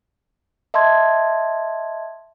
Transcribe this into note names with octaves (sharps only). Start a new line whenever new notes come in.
D#5 E5 A5 C6 G#6